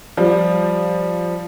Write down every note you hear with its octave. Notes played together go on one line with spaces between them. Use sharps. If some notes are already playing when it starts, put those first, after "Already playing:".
F3 G3